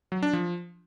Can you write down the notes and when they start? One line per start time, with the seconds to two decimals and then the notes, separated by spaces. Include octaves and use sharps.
0.12 F#3
0.23 D4
0.33 F3